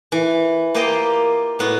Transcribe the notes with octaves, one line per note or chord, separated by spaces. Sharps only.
E3
A#3 F4 G4 C5 D#5 G5
A2 B3 F#4